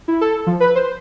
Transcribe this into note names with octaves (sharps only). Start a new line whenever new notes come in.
E4
A4
F3
B4
C5